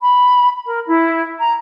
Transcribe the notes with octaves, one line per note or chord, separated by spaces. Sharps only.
B5
A#4
E4
A#5